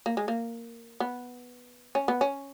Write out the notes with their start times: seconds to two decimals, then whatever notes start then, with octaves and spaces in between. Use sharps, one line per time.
0.06 A#3
0.17 G#3
0.28 A#3
1.00 B3
1.95 C#4
2.08 B3
2.21 C#4